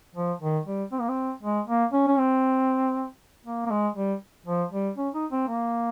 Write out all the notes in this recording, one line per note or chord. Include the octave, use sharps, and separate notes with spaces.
F3
D#3
G3
C4
A#3
C4
G#3
A#3
C#4
C#4
C4
A#3
A#3
G#3
G3
F3
G3
C#4
D#4
C4
A#3